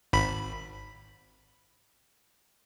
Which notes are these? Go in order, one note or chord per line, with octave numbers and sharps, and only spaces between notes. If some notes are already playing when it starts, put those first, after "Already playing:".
G#1 B5